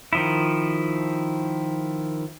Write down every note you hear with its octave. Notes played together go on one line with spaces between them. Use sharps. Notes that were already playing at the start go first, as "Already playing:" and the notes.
D#3 F3 E4